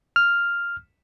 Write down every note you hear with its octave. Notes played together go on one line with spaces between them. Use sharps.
F6